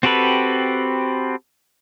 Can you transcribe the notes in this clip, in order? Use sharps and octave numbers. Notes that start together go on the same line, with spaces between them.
C4 F#4 G4 A4 B4